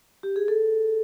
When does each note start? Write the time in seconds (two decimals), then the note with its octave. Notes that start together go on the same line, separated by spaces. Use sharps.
0.23 G4
0.36 G#4
0.48 A4